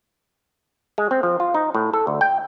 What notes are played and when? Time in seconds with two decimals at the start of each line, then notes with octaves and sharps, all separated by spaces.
0.98 G#3
1.11 C4
1.23 F3
1.40 F4
1.54 D#4
1.75 A2
1.93 A4
2.07 D2
2.21 G5